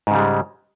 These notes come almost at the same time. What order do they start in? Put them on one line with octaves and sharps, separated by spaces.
G#2 C#3 G3 G#3